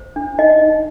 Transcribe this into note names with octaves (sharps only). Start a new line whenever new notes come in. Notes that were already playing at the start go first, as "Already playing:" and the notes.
Already playing: C5
D4
D#4 D#5
D#4